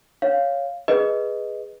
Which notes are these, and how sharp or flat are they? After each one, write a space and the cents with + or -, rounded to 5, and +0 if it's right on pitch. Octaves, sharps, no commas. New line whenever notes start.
C#5 +0 F5 +0
G#4 +0 B4 +0 D#5 +0